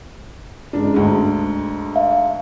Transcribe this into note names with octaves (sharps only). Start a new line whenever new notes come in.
G#2 C#3 D4
D2 G#2
E5 F5